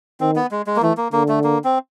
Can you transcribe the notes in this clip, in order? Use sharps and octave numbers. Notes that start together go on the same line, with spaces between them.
D#3 C4
B3
G#3
G#3
A#3
E3 A3
A#3
D3 A#3
A3
A#3
C4